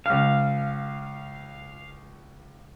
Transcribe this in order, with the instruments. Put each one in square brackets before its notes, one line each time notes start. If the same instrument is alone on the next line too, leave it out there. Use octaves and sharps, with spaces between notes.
[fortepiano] C#2 F6 [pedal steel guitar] F5